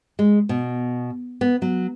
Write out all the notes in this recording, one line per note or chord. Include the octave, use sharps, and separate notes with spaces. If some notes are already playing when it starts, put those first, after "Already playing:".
G#3
B2
B3
F#3